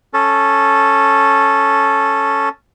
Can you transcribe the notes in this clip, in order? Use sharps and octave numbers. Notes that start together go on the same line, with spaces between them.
C#4 A4